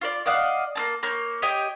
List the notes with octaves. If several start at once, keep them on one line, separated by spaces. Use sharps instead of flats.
F4 C#5 D5
D5 D#5 F5 F#5
A#3 C4 A5
A#3 C#5 G6
G4 C#5 D#5 G5